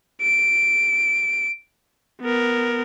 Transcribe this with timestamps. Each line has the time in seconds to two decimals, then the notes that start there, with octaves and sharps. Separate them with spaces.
0.22 D7
2.21 B3 A#4